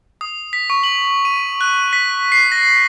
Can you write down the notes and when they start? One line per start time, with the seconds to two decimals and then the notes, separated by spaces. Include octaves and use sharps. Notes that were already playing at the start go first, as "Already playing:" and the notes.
0.21 D#6
0.53 B6
0.70 C#6
0.83 F#7
1.25 D#7
1.61 F#6
1.93 B6
2.32 C7
2.52 A#6